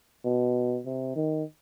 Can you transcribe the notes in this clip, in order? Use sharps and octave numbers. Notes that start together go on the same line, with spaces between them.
B2
C3
D#3